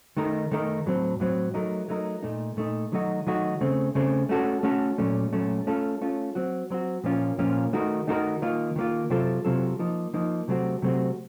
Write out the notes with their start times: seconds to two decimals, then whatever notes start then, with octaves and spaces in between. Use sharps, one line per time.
0.17 D#3 A3 D#4 A#4
0.51 D#3 A3 D#4 A#4
0.86 A2 F#3 C4
1.20 A2 F#3 C4
1.54 F#3 A3 D#4 A#4
1.88 F#3 A3 D#4 A#4
2.23 A#2 A3 D#4
2.57 A#2 A3 D#4
2.92 D#3 F#3 A3 D#4 F#4
3.27 D#3 F#3 A3 D#4 F#4
3.61 C#3 A3 C4
3.95 C#3 A3 C4
4.29 A3 C#4 F#4 A4
4.63 A3 C#4 F#4 A4
4.98 A#2 F#3 A3 C#4
5.33 A#2 F#3 A3 C#4
5.67 A3 C#4 F4 A4
6.01 A3 C#4 F4 A4
6.35 F#3 C4 F#4
6.70 F#3 C4 F#4
7.04 A#2 F3 A#3 C#4 F4
7.39 A#2 F3 A#3 C#4 F4
7.73 D#3 A3 D#4 F#4 A#4
8.07 D#3 A3 D#4 F#4 A#4
8.42 D#3 A#3 F4
8.76 D#3 A#3 F4
9.10 C3 F#3 C4 F4 A4
9.45 C3 F#3 C4 F4 A4
9.79 F3 A#3 D#4
10.14 F3 A#3 D#4
10.48 C3 F#3 A3 C4 F#4
10.82 C3 F#3 A3 C4 F#4